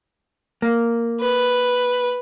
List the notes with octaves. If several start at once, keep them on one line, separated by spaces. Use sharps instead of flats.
A#3
B4